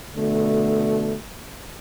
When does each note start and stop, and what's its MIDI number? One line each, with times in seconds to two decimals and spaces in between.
0.16 1.15 47
0.16 1.15 50
0.16 1.15 57